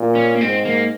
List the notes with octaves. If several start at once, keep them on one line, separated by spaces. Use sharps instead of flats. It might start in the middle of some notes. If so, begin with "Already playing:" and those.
Already playing: A#2
C#4
A#3
G#2 C4
A#3